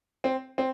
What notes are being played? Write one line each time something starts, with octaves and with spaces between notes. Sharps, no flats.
C4
C4